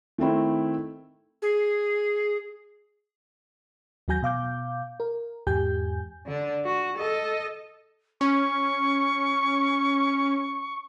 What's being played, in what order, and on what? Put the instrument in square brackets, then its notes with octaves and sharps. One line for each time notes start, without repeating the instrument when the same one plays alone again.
[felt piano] D#3 A3 C4 E4
[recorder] G#4
[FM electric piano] D#2 F#3 F#4 G#5 G6 A#6
B2 F5 D6 G6
A#4
E2 G#2 G4 G#5 G6
[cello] D3 D4
F#4
A4 D#5
[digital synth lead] C#4 [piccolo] C#6